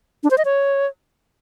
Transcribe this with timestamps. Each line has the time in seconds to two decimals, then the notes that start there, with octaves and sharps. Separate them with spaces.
0.23 D4
0.31 C5
0.38 D#5
0.45 C#5